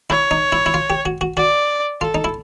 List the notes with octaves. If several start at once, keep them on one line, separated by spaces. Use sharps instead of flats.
E4 C#5
D#4
E4
E4
F4
G4
F#4
F#4
F#4 D5
F4 A4
D#4
E4